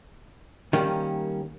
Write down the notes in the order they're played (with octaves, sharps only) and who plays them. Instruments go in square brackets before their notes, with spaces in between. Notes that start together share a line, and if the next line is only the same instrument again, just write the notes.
[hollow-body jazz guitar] D#3 G3 A#3 C#4